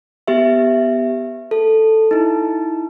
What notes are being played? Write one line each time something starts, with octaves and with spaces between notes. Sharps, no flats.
B3 G4 E5
A4
D#4 E4